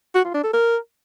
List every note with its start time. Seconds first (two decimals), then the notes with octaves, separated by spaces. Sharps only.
0.15 F#4
0.25 F4
0.34 D4
0.44 A4
0.53 A#4